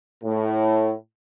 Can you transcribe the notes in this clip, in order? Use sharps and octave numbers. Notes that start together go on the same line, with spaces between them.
A2